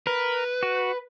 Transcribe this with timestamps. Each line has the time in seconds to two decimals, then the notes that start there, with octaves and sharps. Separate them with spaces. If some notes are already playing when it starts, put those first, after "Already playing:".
0.07 A#4 B4
0.63 F#4